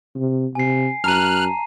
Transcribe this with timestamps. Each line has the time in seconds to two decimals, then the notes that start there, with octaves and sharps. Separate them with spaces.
0.16 C3
0.55 C3 G#5 C7
1.04 F#2 A5 A#5 F6 F#6 D#7